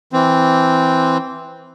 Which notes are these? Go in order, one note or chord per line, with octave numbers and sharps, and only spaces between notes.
E3 C4